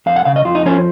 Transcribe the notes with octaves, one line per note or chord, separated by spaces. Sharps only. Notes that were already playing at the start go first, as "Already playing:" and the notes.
F2 F5
F#5
C#3 F5
D#5
F2 F4
D#4
F3 C#4